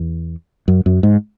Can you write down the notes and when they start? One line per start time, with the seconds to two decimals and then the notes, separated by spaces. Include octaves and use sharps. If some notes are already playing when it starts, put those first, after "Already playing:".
Already playing: E2
0.68 F#2
0.86 F#2
1.03 G#2